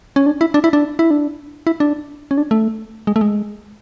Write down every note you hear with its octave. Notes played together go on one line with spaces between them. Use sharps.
C#4
D4
E4
D4
E4
D4
E4
D4
E4
D4
C#4
D4
A3
G#3
A3
G#3